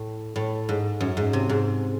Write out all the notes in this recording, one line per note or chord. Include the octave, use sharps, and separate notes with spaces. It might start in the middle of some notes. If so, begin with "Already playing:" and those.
Already playing: A2
A2
G#2
F#2
G#2
C3
G#2